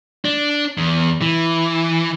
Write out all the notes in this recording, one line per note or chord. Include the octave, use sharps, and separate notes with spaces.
D4
E2
E3